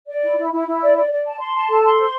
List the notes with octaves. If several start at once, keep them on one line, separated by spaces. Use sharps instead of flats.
D5
E4
E4
E4
E4
D5
D5
D5
A5
C6
A5
A4
C6
C5